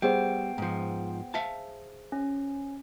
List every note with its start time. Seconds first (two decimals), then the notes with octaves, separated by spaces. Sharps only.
0.02 G3 B3 G#4 C5 G5
0.58 G#2 F3
1.34 E5 F5 A5
2.12 C#4